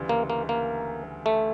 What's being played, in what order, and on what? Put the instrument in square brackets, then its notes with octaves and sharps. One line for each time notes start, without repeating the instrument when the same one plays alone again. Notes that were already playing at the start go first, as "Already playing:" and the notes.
Already playing: [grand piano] D2 C#3 E3 G3
[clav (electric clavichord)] A#3
A#3
A#3
A3